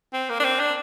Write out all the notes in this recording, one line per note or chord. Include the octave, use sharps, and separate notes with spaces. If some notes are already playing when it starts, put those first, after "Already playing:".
C4
A#3
D4
C4
D4